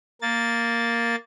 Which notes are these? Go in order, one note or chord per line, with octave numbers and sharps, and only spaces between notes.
A#3 A6